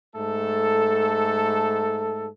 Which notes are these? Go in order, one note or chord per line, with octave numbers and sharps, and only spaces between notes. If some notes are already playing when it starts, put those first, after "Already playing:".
G#2 A3 A4